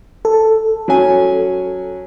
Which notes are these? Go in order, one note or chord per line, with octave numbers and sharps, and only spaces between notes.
A4
F#3 C#4 G#5